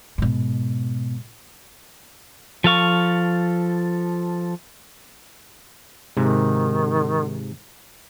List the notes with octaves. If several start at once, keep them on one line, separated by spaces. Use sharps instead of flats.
G#2 B2
F3 A4 F5 C#6
G#2 C3 D#3